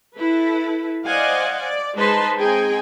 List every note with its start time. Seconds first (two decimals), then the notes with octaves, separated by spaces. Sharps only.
0.15 E4 A4 B4
1.06 C5 D5 D#5 F5 F#5 G#5
1.61 D5
1.97 G#3 D#4 B4 C5 A5 C6
2.38 C4 D#4 G#4 G5 G#5